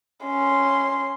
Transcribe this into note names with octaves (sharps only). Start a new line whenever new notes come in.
C#4 C6